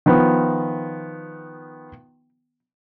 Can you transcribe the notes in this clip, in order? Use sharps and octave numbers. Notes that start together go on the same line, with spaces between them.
D#3 F3 B3